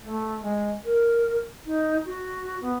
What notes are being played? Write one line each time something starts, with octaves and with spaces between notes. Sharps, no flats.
A3
G#3
A#4
D#4
F#4
B3